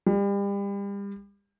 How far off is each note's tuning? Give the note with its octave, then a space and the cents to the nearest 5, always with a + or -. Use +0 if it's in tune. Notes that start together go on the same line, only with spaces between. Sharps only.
G3 +35